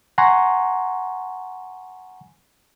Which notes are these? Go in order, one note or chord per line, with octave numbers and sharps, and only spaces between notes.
F#5 G#5 A#5 C6 C#6